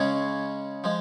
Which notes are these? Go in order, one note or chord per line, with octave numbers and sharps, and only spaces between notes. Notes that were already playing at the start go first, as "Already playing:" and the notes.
Already playing: C#3 G#3 C#4 G#4
F3 G#3